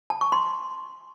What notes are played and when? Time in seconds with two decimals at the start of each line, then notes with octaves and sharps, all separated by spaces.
0.10 A5
0.21 C#6
0.32 C6